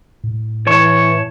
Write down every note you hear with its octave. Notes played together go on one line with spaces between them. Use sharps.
A2
E3 C#5 A5 C#6